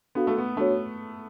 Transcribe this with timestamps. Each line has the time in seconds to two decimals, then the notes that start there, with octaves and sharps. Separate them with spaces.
0.15 B3 D4 F#4 A4 F5
0.27 A3
0.38 B3
0.56 A3 D4 F#4 C#5